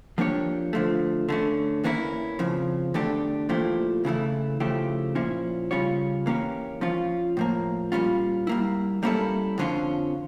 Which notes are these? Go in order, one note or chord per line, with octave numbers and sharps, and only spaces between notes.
F3 A#3 D4 G4 C#5
D3 F3 A3
D3 A3 C#4
E2 E3 A#3 C#4 E4
F2 C#3 F3
E2 D3 A3 D4 G4
A#2 F3 A3 E4 G4
C#3 E3 A3 E4
C#3 F3 A3 E4 G4
A#2 F3 C#4 E4
C#3 G3 C#4 F4 C#5
E3 A#3 C#4 G4 C#5
F3 C#4 F4
A2 F3 A#3
A#2 G3 C#4 F4
G3 A#3 E4
G3 A#3 C#4 E4 A4
F2 D3 F3 C#4 F4